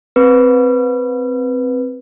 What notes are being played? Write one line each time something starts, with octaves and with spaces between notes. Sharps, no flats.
C4 B4